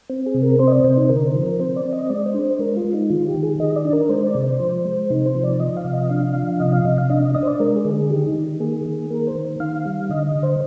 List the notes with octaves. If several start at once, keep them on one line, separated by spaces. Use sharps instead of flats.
C4
G#4
C3
A#4
C4 C5
D#5
D5
C3 C5
D#4
D3 A#4
C5
F3
A#4
C4 C5
D5
C4
D#5
G#3 D5
C5
D4
C5
G#3 A#4
F4
G#3
D#4
D#3 F4
G4
D#3
G#4
D#3 D#5
D5
D4
A#4
G#3 C5
D5
C3
C5
F3
G#3
C3 D#4
C5
F3
D5
F3 D#5
F5
C3
D#5
D4 F5
F3
C3 D#5
F5
C3 D#5
F5
D4 D#5
D#5
D4 D#5
C5
D5
G#3 A#4
G#4
D3
G#4
D#3 G4
D#4
D#3
A#3 G#4
D#3
A#3 A#4
C5
D#3
D#3 F5
G3
D3 D#5
D#5
D3
C5